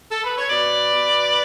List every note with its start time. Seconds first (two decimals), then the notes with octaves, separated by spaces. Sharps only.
0.11 A4
0.24 B4
0.38 C#5
0.50 B2 B4 D5
0.95 B2